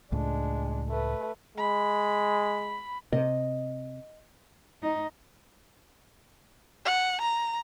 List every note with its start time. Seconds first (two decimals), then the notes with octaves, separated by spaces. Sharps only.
0.12 C#2 A2 G#3 D4
0.89 A3 B4
1.57 G#3 B5
3.12 C3 D#5
4.82 D#4
6.85 F#5
7.21 A#5